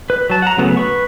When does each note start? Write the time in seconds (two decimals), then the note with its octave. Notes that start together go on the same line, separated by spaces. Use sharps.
0.10 B4
0.30 F#3 A5
0.42 F#5 A#5
0.57 C#3 F#3 A3 B3
0.77 B4 C#6